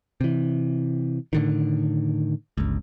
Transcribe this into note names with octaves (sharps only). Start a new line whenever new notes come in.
C3 E3
A2 D3 D#3
G1 C#2